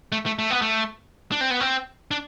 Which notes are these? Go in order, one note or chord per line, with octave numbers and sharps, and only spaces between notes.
A3
A3
A3
B3
A3
D4
C4
B3
C4
D4